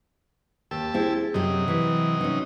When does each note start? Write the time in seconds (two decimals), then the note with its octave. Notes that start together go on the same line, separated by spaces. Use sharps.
0.71 D#2 G4 A5 E6
0.94 C4 E4 G#4
1.34 F#2 C3 F#3 G4 D#5
1.68 E3 B4
2.21 C#4 D#4